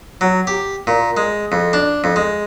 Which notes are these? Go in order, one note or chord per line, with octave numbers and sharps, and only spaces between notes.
F#3
G4
A#2
G#3
F2
D4
F2
G#3